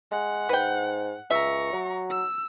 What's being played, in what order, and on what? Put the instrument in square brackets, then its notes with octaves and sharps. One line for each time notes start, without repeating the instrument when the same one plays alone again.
[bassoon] G#3 [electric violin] F#5
[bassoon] G#2 [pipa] B4 G5
[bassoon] C#2 [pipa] E5 [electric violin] A#5 C#6
[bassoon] F#3
[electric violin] E6